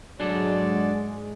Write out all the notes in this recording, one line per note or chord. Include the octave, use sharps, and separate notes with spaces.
G#2 F#3 G#3 D4 G#4 A4 D5